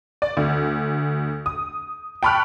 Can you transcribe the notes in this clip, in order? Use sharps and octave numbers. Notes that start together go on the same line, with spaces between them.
D5
D2
D#6
G5 A5 B5 C#6 F6 F#6